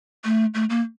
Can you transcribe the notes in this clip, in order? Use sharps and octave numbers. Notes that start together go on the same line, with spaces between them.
A3
A3
A#3